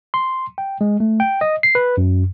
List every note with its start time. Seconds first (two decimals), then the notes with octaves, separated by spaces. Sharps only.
0.14 C6
0.58 G5
0.81 G#3
1.00 A3
1.20 G5
1.41 D#5
1.63 C7
1.75 B4
1.97 F#2